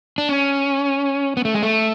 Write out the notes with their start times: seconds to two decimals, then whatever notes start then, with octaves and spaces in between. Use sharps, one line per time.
0.18 D4
0.29 C#4
1.37 B3
1.45 A3
1.55 G#3
1.63 A3